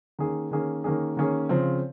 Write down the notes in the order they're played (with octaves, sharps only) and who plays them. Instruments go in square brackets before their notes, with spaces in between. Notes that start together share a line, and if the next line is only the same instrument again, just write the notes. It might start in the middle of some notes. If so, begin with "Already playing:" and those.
[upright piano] D#3 A#3 C#4 G#4
D#3 A#3 C#4 G#4
D#3 A#3 C#4 G#4
D#3 A#3 C#4 G#4
C#3 F3 C4